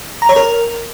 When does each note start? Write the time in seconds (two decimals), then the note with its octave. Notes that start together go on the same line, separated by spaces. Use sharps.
0.22 A#5
0.29 C#5
0.36 A#4